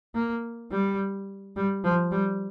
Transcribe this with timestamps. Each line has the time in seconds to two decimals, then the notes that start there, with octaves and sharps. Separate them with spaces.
0.15 A#3
0.71 G3
1.56 G3
1.84 F3
2.12 G3